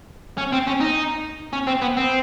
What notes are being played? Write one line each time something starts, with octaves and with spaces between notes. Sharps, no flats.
C#4
C4
C#4
D#4
C#4
C4
B3
C4